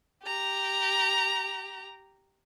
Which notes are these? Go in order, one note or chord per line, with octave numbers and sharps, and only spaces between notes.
G4 A#5